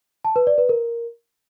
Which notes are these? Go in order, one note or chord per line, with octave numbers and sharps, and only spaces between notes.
A5
B4
D5
B4
A#4